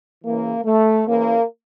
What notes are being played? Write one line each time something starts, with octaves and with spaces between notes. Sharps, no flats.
C#3 E3 A#3
A3
C#3 E3 A#3